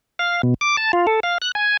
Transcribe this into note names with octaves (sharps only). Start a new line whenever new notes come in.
F5
B2
D6
A5
F4
A4
F5
F#6
G#5